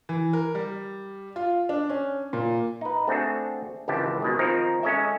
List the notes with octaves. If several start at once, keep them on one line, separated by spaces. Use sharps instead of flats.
E3
A#4
G3
F4
D4
C#4
A#2
D#4 B4
A3 C4 D4 F#4 G#4 A4
G#1 C#2 E3 G4 G5 A5
B2 D#3 G#3
D#3 F3 C4 D#4 A#4
G#3 C#4 A4 C#5 D#5 E5